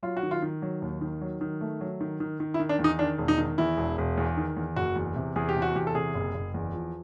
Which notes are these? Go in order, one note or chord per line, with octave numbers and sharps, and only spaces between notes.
F#3 F4
F#4
D#3
F4
D#3
F#3
D#2
D#3
F#3
D#3
A3
F#3
D#3
D#3
D#3
E4
D#3
D4
E2
D#4
D#3 D4
E1
D#4
D#3
E2 E4
E1
E1
E2
D#3
E2
F#1 F#4
E2
C3
E2 G#4
G4
C3
F#4
E2 G4
A4
C3 G#4
F#1
F#1
E2
F3